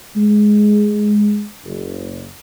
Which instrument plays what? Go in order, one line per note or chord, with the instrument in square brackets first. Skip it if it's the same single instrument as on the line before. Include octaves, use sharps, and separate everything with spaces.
[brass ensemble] G#3
F#1